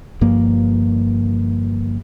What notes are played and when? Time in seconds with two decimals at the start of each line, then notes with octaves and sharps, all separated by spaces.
0.21 G1 G2 F3 A#3